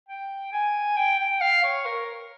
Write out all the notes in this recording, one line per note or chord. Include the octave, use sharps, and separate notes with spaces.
G5
G#5
G5
G5
F5
C#5
A#4